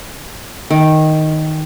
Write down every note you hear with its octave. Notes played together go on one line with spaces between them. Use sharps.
D#3